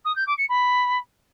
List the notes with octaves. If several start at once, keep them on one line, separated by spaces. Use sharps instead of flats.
D#6
G6
D6
C#7
B5